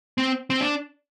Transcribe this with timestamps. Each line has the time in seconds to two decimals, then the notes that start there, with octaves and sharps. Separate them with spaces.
0.18 C4
0.50 C4
0.61 D4